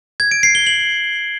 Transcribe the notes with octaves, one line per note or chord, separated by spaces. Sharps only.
G#6
D7
C7
G7
F#7